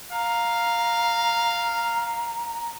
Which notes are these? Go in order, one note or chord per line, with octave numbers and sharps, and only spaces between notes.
F5 A#5